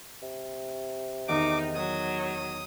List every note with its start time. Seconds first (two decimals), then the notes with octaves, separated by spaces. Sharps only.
0.22 C3
1.28 E2 D#3 D#4 D6
1.75 F#3 D#6